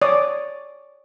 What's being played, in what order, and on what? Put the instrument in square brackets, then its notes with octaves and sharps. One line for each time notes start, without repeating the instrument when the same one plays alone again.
[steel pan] C#5 D5 D#6